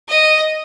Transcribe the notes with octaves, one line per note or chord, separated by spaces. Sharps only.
D#5